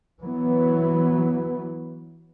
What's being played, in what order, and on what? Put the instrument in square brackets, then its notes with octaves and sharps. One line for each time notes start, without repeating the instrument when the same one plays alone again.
[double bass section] E3 F#3 B3